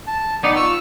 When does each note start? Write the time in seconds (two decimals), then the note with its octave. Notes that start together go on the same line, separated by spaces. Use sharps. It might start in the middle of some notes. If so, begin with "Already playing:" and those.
0.07 A5
0.43 B3 D#4 D5 F#5
0.56 F4 C#6 E6